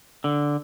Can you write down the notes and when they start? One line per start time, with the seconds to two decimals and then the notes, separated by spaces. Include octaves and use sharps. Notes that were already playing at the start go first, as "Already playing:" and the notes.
0.24 D3